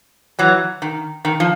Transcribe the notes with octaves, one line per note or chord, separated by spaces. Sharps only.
E3 F#3
D#3
D#3
F3